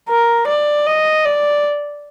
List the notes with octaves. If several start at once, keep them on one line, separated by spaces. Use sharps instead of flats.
A#4
D5
D#5
D5